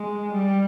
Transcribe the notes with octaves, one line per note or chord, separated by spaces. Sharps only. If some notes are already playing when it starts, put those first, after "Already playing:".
Already playing: G#3
G3